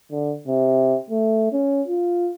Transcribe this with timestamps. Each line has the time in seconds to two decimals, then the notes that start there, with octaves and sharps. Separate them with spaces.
0.11 D3
0.47 C3
1.10 A3
1.53 C#4
1.88 F4